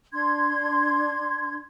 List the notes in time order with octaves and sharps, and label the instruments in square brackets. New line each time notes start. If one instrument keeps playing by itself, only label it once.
[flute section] D4 C6 G#6